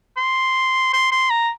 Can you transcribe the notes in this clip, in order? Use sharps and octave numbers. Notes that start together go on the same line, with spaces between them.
C6
C6
C6
A#5